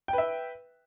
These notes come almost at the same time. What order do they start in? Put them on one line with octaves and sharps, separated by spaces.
G5 B4 E5